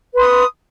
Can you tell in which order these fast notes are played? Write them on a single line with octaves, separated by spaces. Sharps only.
B4 C6 D#6